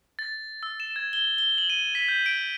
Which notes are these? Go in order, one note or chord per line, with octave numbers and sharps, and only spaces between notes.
A6
E6
E7
G#6
G7
G7
F#7
D#7
B6
G6
D7